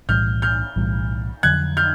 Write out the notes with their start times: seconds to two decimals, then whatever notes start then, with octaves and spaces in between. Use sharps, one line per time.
0.09 B1 A2 E3 G3 F6 G6
0.42 F6 G6
0.76 B1 A2 E3 G3
1.43 F2 D3 F#3 F#6 G#6
1.77 F6 G6